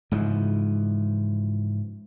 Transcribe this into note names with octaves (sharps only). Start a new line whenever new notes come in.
G#2 C#3 E3 F3